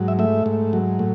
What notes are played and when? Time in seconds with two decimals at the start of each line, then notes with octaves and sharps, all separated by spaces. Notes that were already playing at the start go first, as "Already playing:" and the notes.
Already playing: G#2 F#3
0.08 E5
0.19 A3 E5
0.46 G#2
0.73 F#3
0.99 A2